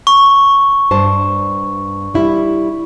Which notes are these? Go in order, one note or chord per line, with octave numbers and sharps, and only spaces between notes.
C#6
G2 C5 A5
G3 E4